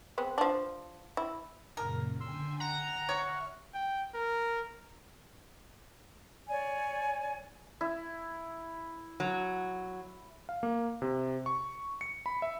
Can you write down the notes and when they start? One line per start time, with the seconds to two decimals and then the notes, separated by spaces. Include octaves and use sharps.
0.18 G#3 B3 C4
0.38 F3 D4
1.17 E4
1.77 F#2 A#2 C#3 A#4
2.20 D3 G5 G#5 C6 E6
2.60 F#5 A#5
3.09 C#5 E5 C#6 F6
3.74 G5
4.14 A#4
6.49 C#5 D5 G#5
7.81 E4
9.20 F#3
10.49 F5
10.63 A#3
11.02 C3
11.46 C#6
12.01 C#7
12.26 B5
12.42 E5